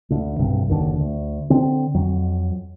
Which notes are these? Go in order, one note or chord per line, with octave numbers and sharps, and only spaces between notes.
D2 D3
B1 G2 C3
F#1 D#2 D3
D2
D3 C4
F2 F#3